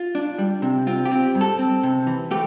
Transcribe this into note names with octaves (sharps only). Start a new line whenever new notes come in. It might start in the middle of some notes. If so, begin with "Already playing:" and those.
Already playing: F4
D4
G3
C3
C4 F4
G4
C4
G2
A4
C4
C3
E3
A3 G4